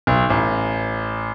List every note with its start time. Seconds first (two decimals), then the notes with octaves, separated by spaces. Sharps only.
0.07 B1
0.30 A1